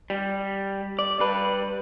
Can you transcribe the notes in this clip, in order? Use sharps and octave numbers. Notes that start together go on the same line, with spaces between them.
G3
D5
G3 B4